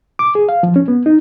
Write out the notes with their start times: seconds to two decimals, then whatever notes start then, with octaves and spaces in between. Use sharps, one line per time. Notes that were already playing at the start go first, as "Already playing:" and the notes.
0.19 D6
0.35 G#4
0.49 F5
0.63 F3
0.76 C#4
0.88 B3
1.06 D#4